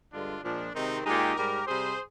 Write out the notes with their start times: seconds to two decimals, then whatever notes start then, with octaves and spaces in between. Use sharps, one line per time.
0.13 G2 D3 G#3 D4 F4
0.44 A#2 F3 G#3 D4
0.75 C3 D#3 G#3 C4 D#4
1.06 A#2 G#3 D#4 G4
1.36 G#2 G3 G4 A#4
1.67 C3 G3 G#4 C5